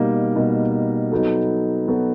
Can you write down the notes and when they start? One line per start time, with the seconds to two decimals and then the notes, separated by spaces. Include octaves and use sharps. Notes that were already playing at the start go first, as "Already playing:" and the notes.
Already playing: B2 G3 A#3 D#4
0.35 B2 G3 A#3 D#4
1.11 F#3 B3 D#4 F#4 A4
1.88 F#3 B3 D#4 F#4 A4